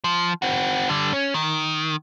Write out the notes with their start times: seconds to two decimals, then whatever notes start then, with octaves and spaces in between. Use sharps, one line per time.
0.04 F3
0.42 C4 F#4
0.89 D3 G3
1.13 C#4
1.34 D#3